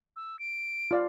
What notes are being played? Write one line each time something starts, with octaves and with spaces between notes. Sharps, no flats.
E6
D7
F4 D5 F5